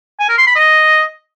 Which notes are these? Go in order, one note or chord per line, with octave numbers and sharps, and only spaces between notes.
G#5
A#4
C6
B5
D#5